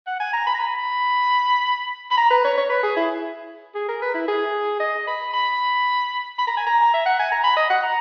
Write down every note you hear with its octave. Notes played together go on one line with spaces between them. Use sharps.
F#5
G#5
A#5
B5
A#5
B5
B5
A#5
B4
C#5
C#5
B4
G#4
E4
G#4
A#4
B4
E4
G#4
D#5
B5
B5
B5
A#5
G#5
A#5
E5
F#5
G#5
A#5
B5
D#5
F#5
A#5